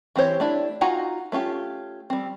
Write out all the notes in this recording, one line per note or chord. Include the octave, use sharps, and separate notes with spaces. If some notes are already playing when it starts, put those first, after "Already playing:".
E3 C4 G4 C5 C#5
A3 D4 E4 G4
D#4 F4 F#4 G#5 A#5
A3 C#4 F4 G4
G3 C4